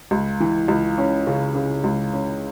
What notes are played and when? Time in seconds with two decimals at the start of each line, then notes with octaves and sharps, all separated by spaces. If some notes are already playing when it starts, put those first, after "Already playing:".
0.11 C#2
0.40 E3
0.68 C#2
0.98 C#4
1.27 C#3
1.55 C#3
1.84 C#2
2.13 C#4